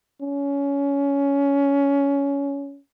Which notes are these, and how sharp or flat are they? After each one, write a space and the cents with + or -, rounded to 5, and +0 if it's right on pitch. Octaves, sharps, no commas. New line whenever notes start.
C#4 +20